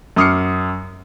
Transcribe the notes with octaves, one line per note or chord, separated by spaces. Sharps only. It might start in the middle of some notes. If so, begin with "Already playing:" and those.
F#2 D6 D#6 F6 C7 C#7